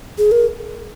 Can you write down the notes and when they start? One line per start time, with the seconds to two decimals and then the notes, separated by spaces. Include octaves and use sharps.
0.18 G#4
0.32 A#4